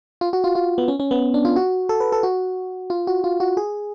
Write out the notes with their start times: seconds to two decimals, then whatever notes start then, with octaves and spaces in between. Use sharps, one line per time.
0.21 F4
0.33 F#4
0.44 F4
0.55 F4
0.78 B3
0.88 C#4
1.00 C#4
1.11 B3
1.34 D4
1.45 F4
1.56 F#4
1.89 A4
2.00 B4
2.12 A4
2.23 F#4
2.90 F4
3.07 F#4
3.24 F4
3.40 F#4
3.57 G#4